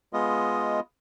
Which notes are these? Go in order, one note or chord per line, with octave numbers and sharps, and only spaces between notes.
G#3 B3 F4 D#5